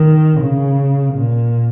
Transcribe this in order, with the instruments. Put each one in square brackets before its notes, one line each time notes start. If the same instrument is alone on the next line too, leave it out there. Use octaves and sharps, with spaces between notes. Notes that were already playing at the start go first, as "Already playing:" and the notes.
Already playing: [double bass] D#3
C#3
A#2